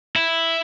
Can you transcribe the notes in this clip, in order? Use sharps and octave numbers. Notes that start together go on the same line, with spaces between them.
E4